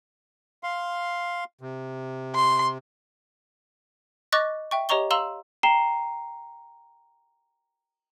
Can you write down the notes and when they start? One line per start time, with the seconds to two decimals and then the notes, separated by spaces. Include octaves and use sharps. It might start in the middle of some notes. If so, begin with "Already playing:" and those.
0.63 F5 C6
1.61 C3
2.35 C6
4.32 D#5 C#6 D6 F#6 A6 A#6
4.71 E5 G5 C#6
4.89 G4 C#5 D#5 A#5 C#6 G7
5.11 F5 A#5 C6 E6 E7 F#7
5.63 G5 A#5 C7 E7 G7